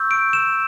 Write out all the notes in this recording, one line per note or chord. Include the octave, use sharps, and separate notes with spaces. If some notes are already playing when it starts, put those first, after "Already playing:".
Already playing: C#6 E6 G6
D7
E7